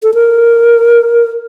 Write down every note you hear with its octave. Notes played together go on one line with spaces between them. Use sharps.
A4
A#4